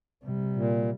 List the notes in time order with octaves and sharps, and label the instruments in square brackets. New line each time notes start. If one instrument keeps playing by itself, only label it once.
[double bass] C3 G3
[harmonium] A#2